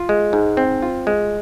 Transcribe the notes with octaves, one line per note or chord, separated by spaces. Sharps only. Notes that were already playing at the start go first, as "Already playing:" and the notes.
Already playing: F4
G#3
G#2
C4
F4
G#3